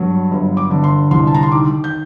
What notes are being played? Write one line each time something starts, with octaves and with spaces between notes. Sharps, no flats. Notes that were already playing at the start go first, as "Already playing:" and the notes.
Already playing: G2 F#3
G1
D6
D3
C6
C2 C6
A5
A#5
C6
D#3 D6
G6